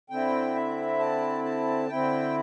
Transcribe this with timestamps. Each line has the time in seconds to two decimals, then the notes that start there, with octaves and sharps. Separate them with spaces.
0.10 D3 C4 E4 G5
0.55 E5
0.99 A5
1.44 A5
1.89 D3 C4 E4 G5